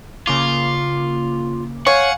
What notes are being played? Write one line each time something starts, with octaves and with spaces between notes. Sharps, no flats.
C#3 A#3 F4 D6
C#5 F5 F#5 G#5 C#6